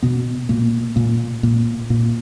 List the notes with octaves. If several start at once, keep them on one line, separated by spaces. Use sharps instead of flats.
B2 B3
A#2 A#3
A#2 A#3
A#2 A#3
A#2 A#3